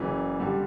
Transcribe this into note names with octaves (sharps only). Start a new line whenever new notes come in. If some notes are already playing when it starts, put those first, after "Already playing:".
Already playing: F#1 F#2 C#3 E3
G2 D3 G3